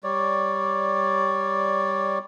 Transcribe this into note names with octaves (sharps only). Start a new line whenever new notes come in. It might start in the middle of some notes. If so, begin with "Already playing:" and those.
G3 C#5 D5